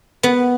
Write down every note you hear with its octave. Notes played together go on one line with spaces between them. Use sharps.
B3